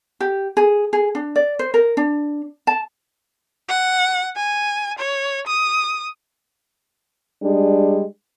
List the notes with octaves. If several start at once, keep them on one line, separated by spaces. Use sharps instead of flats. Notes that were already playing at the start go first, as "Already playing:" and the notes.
G4
G#4
G#4
D4
D5
C5
A#4
D4
A5
F#5
G#5
C#5
D#6
G3 G#3 D4 G#4